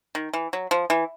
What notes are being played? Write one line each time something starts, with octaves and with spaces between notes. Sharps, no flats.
D#3
E3
F#3
F3
E3